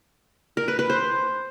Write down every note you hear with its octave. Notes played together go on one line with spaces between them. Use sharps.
A#4
B4
B4
C5